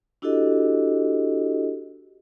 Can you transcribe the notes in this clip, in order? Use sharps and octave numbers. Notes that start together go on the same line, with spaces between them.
D4 E4 F#4 G4 A4 D#5